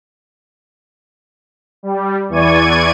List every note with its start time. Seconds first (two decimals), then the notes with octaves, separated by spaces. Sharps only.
1.83 G3
2.29 E2 E3 D5 C#6 G#6 D#7